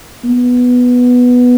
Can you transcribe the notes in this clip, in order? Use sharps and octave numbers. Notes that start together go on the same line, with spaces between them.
B3